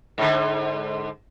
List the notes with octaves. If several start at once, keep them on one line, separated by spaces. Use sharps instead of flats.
G#2 D3